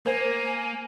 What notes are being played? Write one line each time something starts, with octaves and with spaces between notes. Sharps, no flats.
A#3 A#4 C5 G#5